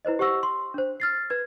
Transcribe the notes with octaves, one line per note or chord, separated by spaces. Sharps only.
E4 B4 C5 D#5
G4 C5 F#5 C#6 E6 A#6
C6
D4 C5
F6 A6 C7
B4 G#6